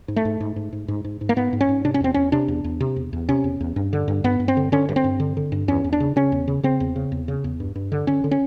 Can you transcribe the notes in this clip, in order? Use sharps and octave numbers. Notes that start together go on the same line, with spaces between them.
G#2
A3
G#2
G#2
G#2
G#2
G#2
G#2
G#2
A#3
G#2 B3
G#2
C#4
G#2
C3 D4
C#4
E2 C4
E2 C#4
C3 D4
E2
E2
C3
E2
E2
C3 C#4
E2
E2
G2
D3
G2
G2 B3
G2
C4
D3
D3 C#4
G2
C4
G2
D3
D3
G2
E2 C#4
E2
D4
C#3
C#3 C#4
E2
C#3
C#3 C4
E2
C#3
E2
C#3
E2
G2
G2
D3
D3 C#4
D3
C#4